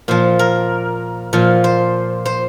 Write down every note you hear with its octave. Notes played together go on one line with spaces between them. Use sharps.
A#2 F3 C5
A#4
A#2 F3
C5
C5